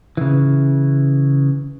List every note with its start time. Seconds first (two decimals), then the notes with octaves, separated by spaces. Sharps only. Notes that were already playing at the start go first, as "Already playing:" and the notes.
0.17 C#3 E3